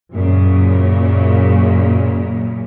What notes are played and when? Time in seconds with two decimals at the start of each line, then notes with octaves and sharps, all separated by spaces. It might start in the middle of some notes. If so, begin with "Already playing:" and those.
0.13 F#2 A#2 C#3